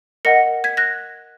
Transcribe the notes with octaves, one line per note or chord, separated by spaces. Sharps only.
A#4 D#5 F#5 A#6 C#7
G#6 B6
F#6 A#6